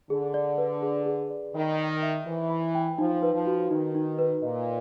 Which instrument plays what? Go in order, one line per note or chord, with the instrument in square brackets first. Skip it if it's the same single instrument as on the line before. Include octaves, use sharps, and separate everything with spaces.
[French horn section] D3 [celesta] G#4
[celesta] D5
B4
G#4
G#4
D5
[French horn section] D#3 [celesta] B5
[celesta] G5
E5
[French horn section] E3 [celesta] C5
[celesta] B5
G5
[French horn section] F3 [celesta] D#4
[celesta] B4
[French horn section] F3
[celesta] F#4
[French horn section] D#3 [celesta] D#4
[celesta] D#4
B4
[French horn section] A#2 [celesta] D#5